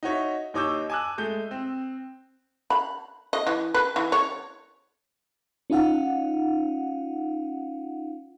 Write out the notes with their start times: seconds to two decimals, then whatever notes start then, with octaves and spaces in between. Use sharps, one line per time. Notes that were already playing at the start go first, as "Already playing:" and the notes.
0.03 D#4 F#4 C#5 E5
0.54 D#2 D#4 C#5 D6 E6 G6
0.90 G#5 A5 D6 E6 F#6
1.18 G#3 A3 G6
1.51 C4
2.70 B5
3.33 D#5
3.47 E3
3.74 B4
3.96 E3
4.12 C#5
5.70 C#4 D#4 F4 F5 F#5